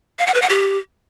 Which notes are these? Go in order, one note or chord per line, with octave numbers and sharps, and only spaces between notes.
F5
F#5
B4
F#5
G4